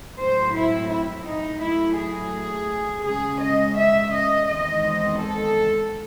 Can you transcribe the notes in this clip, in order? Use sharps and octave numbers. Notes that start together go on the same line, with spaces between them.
A2 F#3 C4 C5
E4
E4
D#4
A2 F#3 A3 E4
G#4
C#3 G#3 C#4 G#4
D#5
E5
D#5
E2 D#3 G#3 C4 D#5
A4